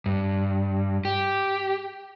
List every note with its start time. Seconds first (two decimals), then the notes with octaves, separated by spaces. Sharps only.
0.06 G2
1.05 G4